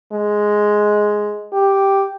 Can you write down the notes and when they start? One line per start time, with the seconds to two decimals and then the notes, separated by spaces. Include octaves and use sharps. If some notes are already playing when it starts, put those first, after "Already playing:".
0.13 G#3
1.53 G4